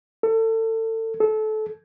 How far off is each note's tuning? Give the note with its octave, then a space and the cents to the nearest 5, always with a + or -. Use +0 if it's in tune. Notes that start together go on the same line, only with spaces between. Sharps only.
A4 +30
A4 -25